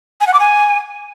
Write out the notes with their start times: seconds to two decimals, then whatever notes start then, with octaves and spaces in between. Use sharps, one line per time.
0.21 G#5
0.27 F#5
0.34 D6
0.40 G#5